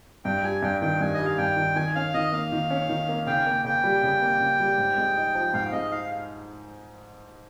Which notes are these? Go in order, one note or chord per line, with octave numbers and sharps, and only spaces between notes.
G2 G5
G3 G#5
G2 G5
D#3 G5
G2 G#5
D#5
G3
F5
G2 G5
D#3
D#3 G#5
C#4 F5
D#3 D#5
A#3 F5
D#3
C#4
D#3
A#3
C#3 G5
A#3
C#3 G5
G3
C#3
A#3
C#3
G3
G#2
G#3
D#4
F3
G#2 F5
G#3 D#5
D#4 F5